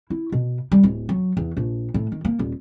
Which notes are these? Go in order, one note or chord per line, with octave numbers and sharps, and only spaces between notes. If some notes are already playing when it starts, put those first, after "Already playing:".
E4
B2
G3
D1
F#3
E2
A#1
A2
D#3
A#3
D#1